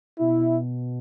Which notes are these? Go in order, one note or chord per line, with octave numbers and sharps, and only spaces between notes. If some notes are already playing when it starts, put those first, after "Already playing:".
B2 E4